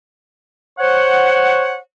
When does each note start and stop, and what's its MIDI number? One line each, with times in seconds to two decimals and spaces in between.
0.79 1.76 72
0.79 1.76 73
0.79 1.76 78